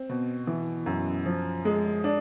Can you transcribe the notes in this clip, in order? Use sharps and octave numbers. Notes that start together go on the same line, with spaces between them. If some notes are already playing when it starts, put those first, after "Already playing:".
Already playing: C4
B2
E3
F#2
F3
G#3
D4